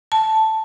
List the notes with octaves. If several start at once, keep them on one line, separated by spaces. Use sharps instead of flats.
A5